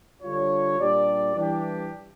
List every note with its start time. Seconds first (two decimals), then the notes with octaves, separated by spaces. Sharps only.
0.22 D3 G3 D4 F4 C#5
0.79 A#2 G3 D4 G4 D5
1.36 E3 G3 D4 G4